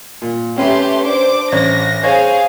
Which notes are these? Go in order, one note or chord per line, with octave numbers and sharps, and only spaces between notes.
A#2
A3 C#4 G4 B4 C6
D4 C5 D6
A1 C#5 A#6
G#4 C5 C#5 F5